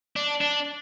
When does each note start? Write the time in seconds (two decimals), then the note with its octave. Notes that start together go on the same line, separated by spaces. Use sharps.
0.16 D4
0.41 D4